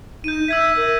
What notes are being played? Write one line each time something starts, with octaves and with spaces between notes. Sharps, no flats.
D#4 G6 D#7
E5 E6 G#6 B6
A#4